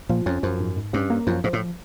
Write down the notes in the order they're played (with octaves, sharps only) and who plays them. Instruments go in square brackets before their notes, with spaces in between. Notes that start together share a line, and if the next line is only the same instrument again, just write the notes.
[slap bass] A#2 [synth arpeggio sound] F3
[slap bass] F2 [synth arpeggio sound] C#4
[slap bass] F#2 [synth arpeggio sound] F3
[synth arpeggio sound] G#2
G#2
[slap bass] G2 [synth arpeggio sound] C#4
[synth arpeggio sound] A#3
[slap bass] F#2 [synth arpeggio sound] F3
[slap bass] G#2 [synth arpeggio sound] F3
[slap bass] A2